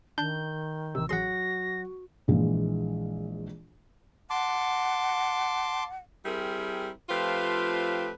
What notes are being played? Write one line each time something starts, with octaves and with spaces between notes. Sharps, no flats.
D#3 D4 A5 G6
A1 C3 E6
A1 F#3 F#4 G#4 F#5 C6 A#6
A#1 E3 G#3
F#5 A5 C6 D6
G3 C4 E4 G#4 A#4
F3 A3 C4 F4 G4 B4